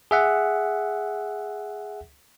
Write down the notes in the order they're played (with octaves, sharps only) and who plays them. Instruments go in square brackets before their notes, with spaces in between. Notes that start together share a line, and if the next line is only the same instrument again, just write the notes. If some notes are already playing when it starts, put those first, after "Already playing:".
[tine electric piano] G#4 E5 F#5